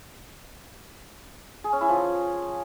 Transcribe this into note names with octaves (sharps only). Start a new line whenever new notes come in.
G#4
C#4
E4
F3